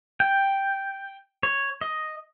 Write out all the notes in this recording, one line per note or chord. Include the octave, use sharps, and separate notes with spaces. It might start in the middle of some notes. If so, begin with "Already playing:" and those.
G5
C#5
D#5